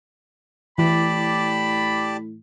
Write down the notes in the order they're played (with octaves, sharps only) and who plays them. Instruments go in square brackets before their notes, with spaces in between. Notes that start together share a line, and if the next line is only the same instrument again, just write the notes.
[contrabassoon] A2 [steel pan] E3 [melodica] G4 D5 A5 [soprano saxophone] B5